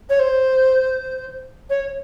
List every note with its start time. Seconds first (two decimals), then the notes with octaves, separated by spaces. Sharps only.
0.09 C#5
0.19 C5
1.69 C#5